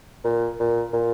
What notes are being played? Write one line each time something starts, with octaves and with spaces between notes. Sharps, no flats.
A#2
A#2
A#2